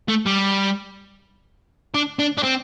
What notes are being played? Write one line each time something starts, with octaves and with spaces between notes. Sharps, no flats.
A3
G3
D4
D4
D4
C4